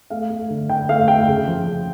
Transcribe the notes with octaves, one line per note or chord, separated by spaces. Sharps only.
A3 F5
A3
D3
D3 G5
A3 F5
A3 G5
C#3
F3
C#3